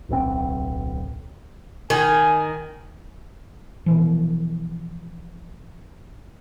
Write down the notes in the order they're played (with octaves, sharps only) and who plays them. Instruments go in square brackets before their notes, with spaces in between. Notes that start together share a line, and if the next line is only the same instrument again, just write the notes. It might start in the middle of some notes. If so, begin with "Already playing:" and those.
[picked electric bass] D1 B1 C#3 C4
[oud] D#3 [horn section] G#5
[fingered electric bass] B2 E3 F3